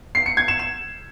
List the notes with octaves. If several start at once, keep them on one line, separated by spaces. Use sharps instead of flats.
C7
C#7
G#6
E7
E7